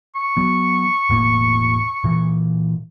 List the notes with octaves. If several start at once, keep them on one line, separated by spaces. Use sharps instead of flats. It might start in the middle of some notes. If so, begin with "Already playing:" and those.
C#6
F#3 B3
E1 A2 A#3
A#2 E3